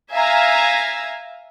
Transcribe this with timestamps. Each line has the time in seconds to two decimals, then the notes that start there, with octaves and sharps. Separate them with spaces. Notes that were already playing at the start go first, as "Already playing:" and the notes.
0.14 E5 F5 G#5 A#5